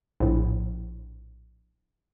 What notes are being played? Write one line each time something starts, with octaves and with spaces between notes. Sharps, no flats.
A#1 A2